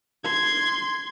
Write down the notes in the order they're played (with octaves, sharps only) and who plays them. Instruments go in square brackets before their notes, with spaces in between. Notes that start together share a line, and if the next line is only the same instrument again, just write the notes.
[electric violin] C6 G#6